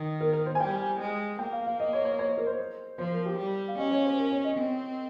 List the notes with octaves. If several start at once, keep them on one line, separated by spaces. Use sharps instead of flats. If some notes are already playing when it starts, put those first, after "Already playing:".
Already playing: D#3
A#4
A#4
C5
G#5
G3 G5
G#3
A#3 G5
F5
F5
D#5
C#5
C#5
C#5
C5
A#4
C5
F3 C5
A#4
G4
G3
F5
C#4 D#5
C#5
C5
A#4
C#5
D#5
C4